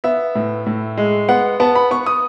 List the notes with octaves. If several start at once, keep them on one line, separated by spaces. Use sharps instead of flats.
B3 E5
A2
A2
G#3
B3 F#5
B3 A5
B5
B3 C#6
D#6